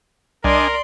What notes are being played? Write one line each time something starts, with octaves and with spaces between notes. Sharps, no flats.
C2 D4 A#4 D5 D#5 G#5 C6